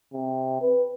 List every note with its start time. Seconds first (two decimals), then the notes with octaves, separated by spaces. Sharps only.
0.13 C3
0.61 B4